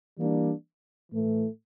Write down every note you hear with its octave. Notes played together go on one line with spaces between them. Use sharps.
E3 G3 A#3 D4
A2 E3 A3